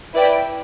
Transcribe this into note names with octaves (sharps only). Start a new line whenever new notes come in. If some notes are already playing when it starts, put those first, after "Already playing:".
E4 B4 D5 G5